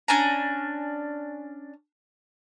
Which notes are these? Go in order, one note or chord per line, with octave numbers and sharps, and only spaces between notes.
C#4 D4 G#5 A#5